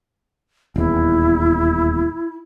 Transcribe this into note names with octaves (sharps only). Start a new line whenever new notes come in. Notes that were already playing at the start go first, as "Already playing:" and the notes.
D#1 E2 E4